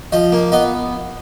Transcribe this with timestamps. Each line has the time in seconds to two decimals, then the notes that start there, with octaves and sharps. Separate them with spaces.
0.12 F3 D#5
0.32 A#3
0.52 B3 D#5